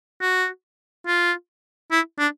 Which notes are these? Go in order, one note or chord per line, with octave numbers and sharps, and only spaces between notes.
F#4
F4
E4
D4